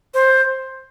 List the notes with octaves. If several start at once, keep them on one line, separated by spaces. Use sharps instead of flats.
C5